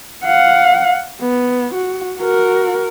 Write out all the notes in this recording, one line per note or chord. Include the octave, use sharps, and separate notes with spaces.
F5 F#5
B3
F#4
F#4 A#4